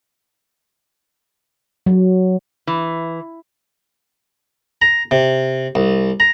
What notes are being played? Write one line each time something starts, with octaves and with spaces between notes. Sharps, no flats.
F#3
E3
A#5
C3
C2
A#5